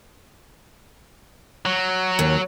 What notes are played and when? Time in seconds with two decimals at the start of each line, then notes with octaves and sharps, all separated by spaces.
1.66 F#3
2.19 D#2